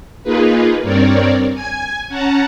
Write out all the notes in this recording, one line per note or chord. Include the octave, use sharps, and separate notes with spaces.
A#3 D#4 F4 G#4 B4
G2 C4 A#4 C#5 D5
G#5 G#6
C#4 F#5 A5 A#5